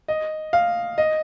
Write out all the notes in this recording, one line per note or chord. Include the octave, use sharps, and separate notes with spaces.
D#5
F5
D#5